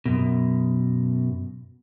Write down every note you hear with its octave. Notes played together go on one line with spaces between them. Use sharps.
F#2 B2